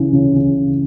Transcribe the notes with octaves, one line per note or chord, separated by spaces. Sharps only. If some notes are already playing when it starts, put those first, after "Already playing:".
Already playing: C#3 E3
C#3
C#3